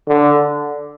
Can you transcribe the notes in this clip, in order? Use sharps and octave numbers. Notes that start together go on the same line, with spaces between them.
D3